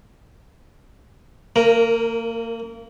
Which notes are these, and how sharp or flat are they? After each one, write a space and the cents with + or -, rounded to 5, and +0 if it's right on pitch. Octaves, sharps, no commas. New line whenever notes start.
A#3 -30 A#4 +0